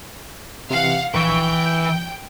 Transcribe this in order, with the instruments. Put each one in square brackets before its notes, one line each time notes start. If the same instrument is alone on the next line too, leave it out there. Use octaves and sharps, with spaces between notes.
[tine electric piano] C3 E3 [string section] F5 F#5
[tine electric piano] A#1 C#6 [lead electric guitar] E3 B4 [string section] G5
[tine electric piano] G6